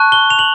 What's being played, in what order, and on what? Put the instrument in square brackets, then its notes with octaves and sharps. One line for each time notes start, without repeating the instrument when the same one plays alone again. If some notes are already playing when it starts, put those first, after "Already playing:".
Already playing: [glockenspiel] A5 C#6 F#6
G7
F7
F#7